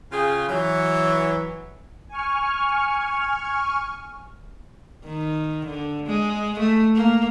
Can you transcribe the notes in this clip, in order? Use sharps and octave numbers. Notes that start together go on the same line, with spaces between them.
C#3 F4 G#4 G5
E3 F#3
G#5 C#6 F6
D#3
D3
G#3
A3
A#3